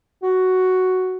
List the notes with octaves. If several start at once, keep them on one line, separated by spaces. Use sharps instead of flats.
F#4